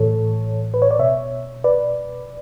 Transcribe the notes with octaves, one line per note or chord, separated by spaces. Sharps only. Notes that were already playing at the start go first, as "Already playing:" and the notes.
Already playing: A2 E3 A4 C#5
B4
C#5
D5
B2 C#5 E5
B4 D5